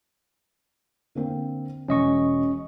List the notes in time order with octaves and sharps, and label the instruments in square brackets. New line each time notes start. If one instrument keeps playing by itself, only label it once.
[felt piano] D3 A#3 C4
[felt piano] E1 [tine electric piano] C#4 D#5 C#6